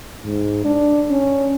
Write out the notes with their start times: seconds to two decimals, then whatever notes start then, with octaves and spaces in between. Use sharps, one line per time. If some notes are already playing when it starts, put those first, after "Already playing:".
0.25 G#2
0.65 D4
1.10 C#4